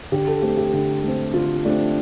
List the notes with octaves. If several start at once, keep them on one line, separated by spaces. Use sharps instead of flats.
D3 G4
A4
A3 C4 G4
G4
D3
A3 C4
D3 F4
A3 C4 D4